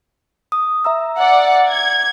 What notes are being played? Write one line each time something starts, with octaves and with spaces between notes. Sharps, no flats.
D#6
E5 A#5 E6
D5 F#5
G#6